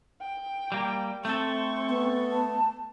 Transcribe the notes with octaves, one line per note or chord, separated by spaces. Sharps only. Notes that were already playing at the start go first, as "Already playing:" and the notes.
G5
G3 A#3
A3 C4 A4 C#6
B3
A5